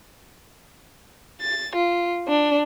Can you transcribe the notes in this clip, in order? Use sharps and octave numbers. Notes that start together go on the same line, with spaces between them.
A6
F4
D4